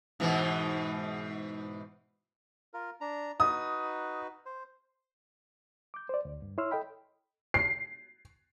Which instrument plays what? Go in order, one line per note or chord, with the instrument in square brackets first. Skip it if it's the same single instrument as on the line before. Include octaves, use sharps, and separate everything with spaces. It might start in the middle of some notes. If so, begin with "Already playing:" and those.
[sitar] G#2 B2 E3
[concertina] F4 A#4
D4 A#5
[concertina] D#4 F#4 B4 [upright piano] D#6
[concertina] C5
[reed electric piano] D6 G6
C5 D5
D2
G2
E4 C#5 C6 E6 F6
A4 D#5 G5 B5
[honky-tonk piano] C7